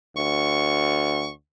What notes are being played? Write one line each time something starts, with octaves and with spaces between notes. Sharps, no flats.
D2 C#6